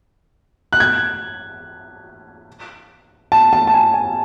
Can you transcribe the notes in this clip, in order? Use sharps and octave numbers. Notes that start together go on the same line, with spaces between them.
F#6
G#6
A5
A5
A5
G#5
G#5